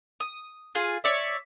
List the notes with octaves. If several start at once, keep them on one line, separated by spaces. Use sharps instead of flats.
D#6
F4 G#4
C#5 D5 E5